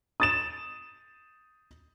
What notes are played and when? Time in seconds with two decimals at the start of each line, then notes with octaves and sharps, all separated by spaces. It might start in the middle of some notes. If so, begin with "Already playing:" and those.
0.20 D#6 A6 E7